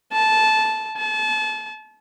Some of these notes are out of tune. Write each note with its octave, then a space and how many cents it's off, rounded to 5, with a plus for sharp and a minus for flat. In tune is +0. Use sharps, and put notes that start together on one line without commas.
A5 -15
A5 -30